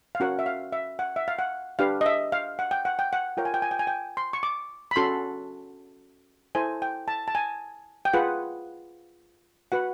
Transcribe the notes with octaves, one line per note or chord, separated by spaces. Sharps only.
F5
C#4 F#4 A#4 C#5 F#5
E5
F5
E5
F#5
E5
F5
F#5
D4 G4 B4 F5
D#5
E5
F5
F#5
G5
F#5
G5
F#5
F4 A#4 C#5 G5
G#5
G5
G#5
G5
G#5
G5
C6
C#6
D6
B5
C#4 F#4 A4 C6
E4 A4 C5 G#5
G5
A5
A5
G#5
G5
F4 G#4 B4 F#5
F#4 B4 F#5